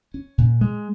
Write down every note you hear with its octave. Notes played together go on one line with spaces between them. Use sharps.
C#4
A#2
G#3